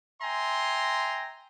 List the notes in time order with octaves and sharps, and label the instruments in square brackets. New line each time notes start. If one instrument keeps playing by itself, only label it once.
[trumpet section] E5 G5 G#5 A#5 C6